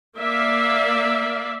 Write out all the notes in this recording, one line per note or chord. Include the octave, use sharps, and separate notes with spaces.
A#3 D5 E5 F5